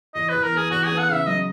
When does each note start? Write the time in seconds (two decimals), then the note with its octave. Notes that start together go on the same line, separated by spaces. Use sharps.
0.15 E2 D#5
0.29 B4
0.34 E2
0.43 A#4
0.52 B3 G#4
0.71 E2 F#4
0.85 B3 G#4
0.99 F#5
1.09 C#3 E5
1.27 F#3 D#5